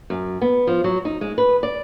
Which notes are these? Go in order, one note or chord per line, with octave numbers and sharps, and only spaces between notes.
F#2
B3
F3
F#3
D#4
G#3
B4
D5